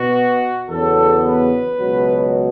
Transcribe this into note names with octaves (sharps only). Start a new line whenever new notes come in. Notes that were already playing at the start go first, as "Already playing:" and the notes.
Already playing: B2 B3 F#4
E2 C#3 F#3 B3 A4
B4
C#2 B2 F#3